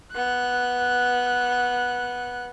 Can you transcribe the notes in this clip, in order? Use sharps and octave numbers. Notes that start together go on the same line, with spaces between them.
B3 F#6